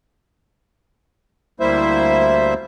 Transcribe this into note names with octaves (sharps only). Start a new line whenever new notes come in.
D2 G3 A#3 E4 C5 E5